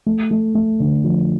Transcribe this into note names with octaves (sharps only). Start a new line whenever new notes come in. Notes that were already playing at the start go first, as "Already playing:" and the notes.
A3
A3
A3
D3
F3